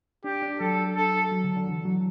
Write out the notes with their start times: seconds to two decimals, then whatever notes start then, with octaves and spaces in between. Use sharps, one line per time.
0.24 D4 G4
0.43 D4
0.60 F#3 A4
0.96 A4
1.32 F#3
1.44 D3
1.56 D3
1.68 E3
1.85 F#3